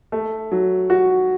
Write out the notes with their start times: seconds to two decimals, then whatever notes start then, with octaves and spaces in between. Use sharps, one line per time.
0.12 A3
0.52 F#3
0.90 F#4